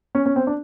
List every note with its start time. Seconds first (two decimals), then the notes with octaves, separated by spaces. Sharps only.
0.15 C#4
0.26 C#4
0.36 C4
0.47 D4